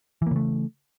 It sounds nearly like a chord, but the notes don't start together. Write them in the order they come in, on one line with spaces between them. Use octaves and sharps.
E3 A#3 C#3 A3